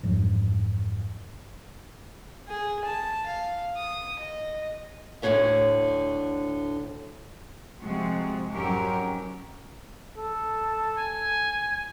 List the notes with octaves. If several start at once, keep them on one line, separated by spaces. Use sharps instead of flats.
F2 G#2 E3 F3
G#4
A5
F5
D#6
D#5
D2 A2 D3 D#4 C#5 E5
C3 F3 G#3 F#4
F2 G#2 F#3 C#4 G4 A#4
A4
G#5